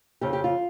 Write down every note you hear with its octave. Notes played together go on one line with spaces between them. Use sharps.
F2 C#3 F3 G4
G4
F4